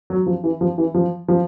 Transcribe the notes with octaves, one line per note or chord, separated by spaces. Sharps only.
F#3
F3
E3
F3
E3
F3
F3